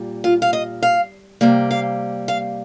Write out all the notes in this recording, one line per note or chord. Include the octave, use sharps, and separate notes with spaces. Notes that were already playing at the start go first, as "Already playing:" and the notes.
Already playing: A#2 G3
F4
F5
D#5
F5
C3 G3 A#3
F5
F5